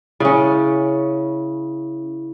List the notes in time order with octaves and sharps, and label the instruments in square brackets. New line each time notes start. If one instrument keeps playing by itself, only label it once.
[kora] C#3 C#4 [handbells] E4